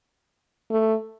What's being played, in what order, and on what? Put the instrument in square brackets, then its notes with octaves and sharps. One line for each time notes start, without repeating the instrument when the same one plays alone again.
[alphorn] A3